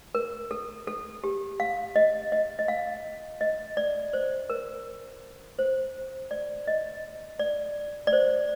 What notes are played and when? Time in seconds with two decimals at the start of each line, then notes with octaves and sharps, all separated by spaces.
0.15 A#4
0.51 A4
0.87 A4
1.24 G4
1.60 F5
1.96 D#5
2.32 D#5
2.59 D#5
2.68 F5
3.41 D#5
3.77 D5
4.13 C5
4.50 A#4
5.59 C5
6.31 D5
6.67 D#5
7.39 D5
8.07 D5
8.13 C5